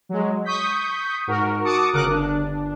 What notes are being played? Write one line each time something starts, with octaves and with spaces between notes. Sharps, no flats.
F#3 G#3
C#6 D#6 G6 B6
G#2 F#4 A#4
F#4 A5 D6 D#6 C#7
G1 C#3 A#4 D6 D#6 F#6
G1 D4